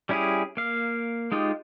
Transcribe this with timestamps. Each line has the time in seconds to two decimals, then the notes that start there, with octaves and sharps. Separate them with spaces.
0.09 G3 C#4 E4 G4 G#4
0.57 A#3 F5
1.32 G#3 D#4 F4 G4